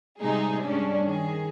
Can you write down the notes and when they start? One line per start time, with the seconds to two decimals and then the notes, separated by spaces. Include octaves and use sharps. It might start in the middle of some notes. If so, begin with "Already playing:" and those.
0.20 C3 G3 G#3 D#4 G#4
0.63 G2 G#3 C#4 D4
1.05 D#3 G#4